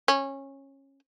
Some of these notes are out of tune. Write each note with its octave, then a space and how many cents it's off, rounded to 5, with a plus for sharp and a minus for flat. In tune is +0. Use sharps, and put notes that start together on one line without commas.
C#4 -20